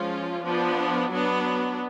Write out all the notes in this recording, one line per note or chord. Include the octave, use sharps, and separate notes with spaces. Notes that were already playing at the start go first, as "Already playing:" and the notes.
Already playing: F3 G#3 C#4 F4
F3 B3 D4
F#3 B3 D4